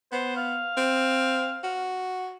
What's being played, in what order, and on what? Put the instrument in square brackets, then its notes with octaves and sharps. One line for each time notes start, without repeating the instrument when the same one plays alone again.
[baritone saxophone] B3 [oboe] C5
[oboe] F5
[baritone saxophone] C4
F#4